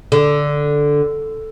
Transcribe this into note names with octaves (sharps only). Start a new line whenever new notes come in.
D3